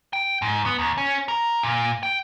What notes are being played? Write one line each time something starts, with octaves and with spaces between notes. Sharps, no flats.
G5
G#2
B3
D#2
C#4
A#4
A#2
G5